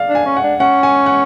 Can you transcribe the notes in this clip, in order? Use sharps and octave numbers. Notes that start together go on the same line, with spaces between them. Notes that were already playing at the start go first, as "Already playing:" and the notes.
Already playing: D5 F5
D4
G#5
C#4
F#5
D4
C#4 F#5
G#5
F#5